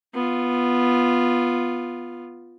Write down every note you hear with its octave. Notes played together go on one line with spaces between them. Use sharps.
B3 F4